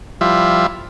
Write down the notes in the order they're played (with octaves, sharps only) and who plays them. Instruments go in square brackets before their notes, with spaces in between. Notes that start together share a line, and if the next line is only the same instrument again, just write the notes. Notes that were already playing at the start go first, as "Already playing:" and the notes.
[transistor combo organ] F3 G3 E4 F4 E5